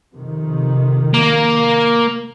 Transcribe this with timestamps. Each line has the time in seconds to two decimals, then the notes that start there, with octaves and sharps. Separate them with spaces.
0.13 F2 C3 D#3
1.14 A#3